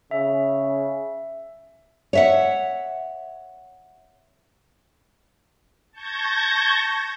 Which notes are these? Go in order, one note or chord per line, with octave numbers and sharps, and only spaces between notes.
C#3 E5
C#5 E5 F#5
A5 C#6 G6 G#6 A#6